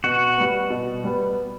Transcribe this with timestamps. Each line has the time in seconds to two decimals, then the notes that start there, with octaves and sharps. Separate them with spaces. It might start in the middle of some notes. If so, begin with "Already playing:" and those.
0.04 B2 F#4
0.38 G3 B3
0.70 B2
1.04 G3 B3